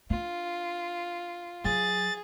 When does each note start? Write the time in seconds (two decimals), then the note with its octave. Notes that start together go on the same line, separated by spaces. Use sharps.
0.10 D4 F4
1.64 F#3 G#4 A6